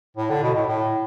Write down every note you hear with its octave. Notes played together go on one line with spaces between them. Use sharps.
A2
D3
B2
A2
A2